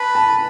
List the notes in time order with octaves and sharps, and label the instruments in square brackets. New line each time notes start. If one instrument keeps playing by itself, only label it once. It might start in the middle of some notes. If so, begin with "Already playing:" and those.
Already playing: [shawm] B4 [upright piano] A5
[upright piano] A5